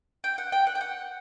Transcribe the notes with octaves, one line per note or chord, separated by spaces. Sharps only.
G5
F#5
G5
F#5
G5
F#5